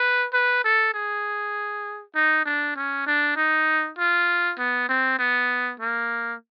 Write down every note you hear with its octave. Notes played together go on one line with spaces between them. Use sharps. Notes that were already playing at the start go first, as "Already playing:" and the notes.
Already playing: B4
B4
A4
G#4
D#4
D4
C#4
D4
D#4
F4
B3
C4
B3
A#3